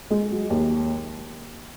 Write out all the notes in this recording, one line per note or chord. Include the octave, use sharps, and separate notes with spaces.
G#3
F#3
D#2